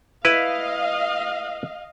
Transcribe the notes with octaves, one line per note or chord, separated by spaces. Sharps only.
E4 B4 D#5 F5